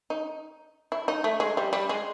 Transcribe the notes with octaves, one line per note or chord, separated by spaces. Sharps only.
D#4
E4
D#4
A3
G#3
G3
G3
G#3